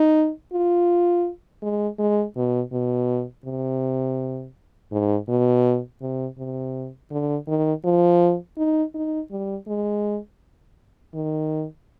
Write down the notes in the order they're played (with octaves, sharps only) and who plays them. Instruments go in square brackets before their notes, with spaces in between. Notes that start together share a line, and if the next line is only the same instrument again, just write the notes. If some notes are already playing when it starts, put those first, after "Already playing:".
Already playing: [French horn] D#4
F4
G#3
G#3
B2
B2
C3
G#2
B2
C3
C3
D3
D#3
F3
D#4
D#4
G3
G#3
D#3